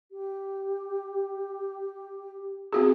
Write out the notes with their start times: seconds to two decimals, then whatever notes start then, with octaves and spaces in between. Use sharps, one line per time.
0.12 G4
2.73 C4 F#4 G#4